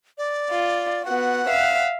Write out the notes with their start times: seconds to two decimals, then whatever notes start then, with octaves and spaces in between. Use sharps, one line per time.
0.18 D5
0.52 F4
1.05 B3 F#4 F#5
1.48 E5 F5